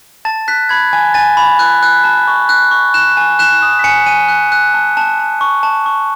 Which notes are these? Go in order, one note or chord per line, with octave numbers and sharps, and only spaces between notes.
A5 A6
F#6 B6
B5 G#6
G#5
G#5 A6
B5
F#6
F#6
A5
C#6
F#6
C#6
F#6 E7
G#5
F#6 E7
D#6
B6
G#5 C#7
G#5 D#7
F#6
F#6
A5
A5
A5
C#6
A5
C#6